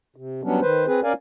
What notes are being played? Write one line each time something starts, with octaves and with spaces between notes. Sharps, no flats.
C3
F#3 G3 B3 C#4 D4
D#3 B4 C5
C4 G#4 B4
C#4 A#4 D5 F5 G#5